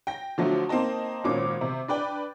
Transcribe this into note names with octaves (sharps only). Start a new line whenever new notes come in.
G5 A#6
D3 F3 F#3 A3
A#3 C4 D#4 D#5 A5
G#1 A#2 C#4 D6
C3
D4 B4 D5 G5